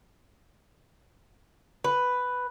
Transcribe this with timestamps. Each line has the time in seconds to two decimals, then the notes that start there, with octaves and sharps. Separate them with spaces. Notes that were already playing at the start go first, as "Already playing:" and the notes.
1.84 B4